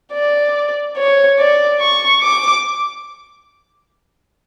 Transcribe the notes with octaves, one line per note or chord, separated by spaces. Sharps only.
D5
C#5
D5
C#6
D6